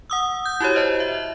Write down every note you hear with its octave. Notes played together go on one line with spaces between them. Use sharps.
F#5 D#6 E6
G6
E4 F#4 G4 C#5
C5 D#5 A5
E5